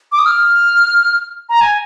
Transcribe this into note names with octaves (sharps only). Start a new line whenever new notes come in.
D6
D#6
F6
A#5
G#5